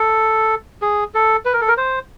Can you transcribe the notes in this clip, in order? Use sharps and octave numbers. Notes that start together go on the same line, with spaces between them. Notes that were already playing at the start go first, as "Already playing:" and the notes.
Already playing: A4
G#4
A4
B4
A#4
A4
A#4
C5